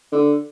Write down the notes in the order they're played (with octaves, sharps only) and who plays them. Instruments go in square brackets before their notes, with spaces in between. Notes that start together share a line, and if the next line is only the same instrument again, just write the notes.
[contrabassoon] D3